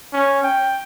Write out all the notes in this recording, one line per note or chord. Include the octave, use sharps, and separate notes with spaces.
C#4
G5